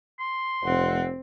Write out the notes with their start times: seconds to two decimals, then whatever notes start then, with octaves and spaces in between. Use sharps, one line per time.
0.20 C6
0.64 F1 C4 F#5